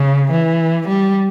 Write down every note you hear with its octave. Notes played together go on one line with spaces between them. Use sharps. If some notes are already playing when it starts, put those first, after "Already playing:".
Already playing: C#3
E3
G3